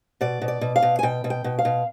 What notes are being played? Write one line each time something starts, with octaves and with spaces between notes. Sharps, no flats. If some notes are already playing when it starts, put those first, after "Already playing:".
B2 D5
B2
D5
B2
F5
B2
G#5
B2 G5
B2
G5
B2
F5
B2